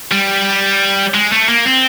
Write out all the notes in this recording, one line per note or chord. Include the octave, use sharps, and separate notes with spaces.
G3
G#3
A3
A#3
C4